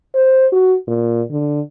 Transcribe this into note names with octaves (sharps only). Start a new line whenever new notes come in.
C5
F#4
A#2
D3